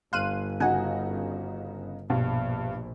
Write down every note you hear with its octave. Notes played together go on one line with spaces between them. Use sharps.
G1 F5 C6 F#6 D#7
C#3 D#4 F#4 F#5 G#5
A#1 G2 B2